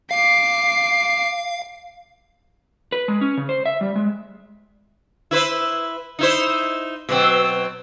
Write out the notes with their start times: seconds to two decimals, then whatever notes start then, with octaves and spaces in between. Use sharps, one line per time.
0.11 F5 D6 C7
2.92 B4
3.08 G#3
3.21 C#4
3.37 C#3
3.49 C5
3.66 E5
3.81 G3
3.96 G#3
5.31 E4 B4 C5
6.19 D#4 E4 C5
7.09 B2 F#3 C4